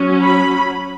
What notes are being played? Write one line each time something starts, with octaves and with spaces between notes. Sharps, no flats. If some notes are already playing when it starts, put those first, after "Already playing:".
Already playing: F#3 C#4
B5